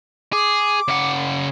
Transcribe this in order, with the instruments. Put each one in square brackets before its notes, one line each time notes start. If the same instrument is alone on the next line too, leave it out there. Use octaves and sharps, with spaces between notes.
[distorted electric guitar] G#4 [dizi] D6
[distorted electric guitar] C#3 F#5